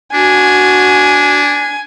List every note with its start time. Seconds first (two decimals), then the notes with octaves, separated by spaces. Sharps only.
0.14 D4 F#4 G#5